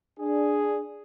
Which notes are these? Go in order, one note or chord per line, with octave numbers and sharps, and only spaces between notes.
D4 G#4